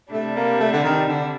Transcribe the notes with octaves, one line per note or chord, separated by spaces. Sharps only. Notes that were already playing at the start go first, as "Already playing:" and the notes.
C3 G3 A3 D4
A#3
A3
D3
D#3
D3